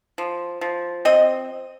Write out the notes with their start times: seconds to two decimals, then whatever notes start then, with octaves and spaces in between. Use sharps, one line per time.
0.18 F3
0.61 F3
1.05 C4 D#5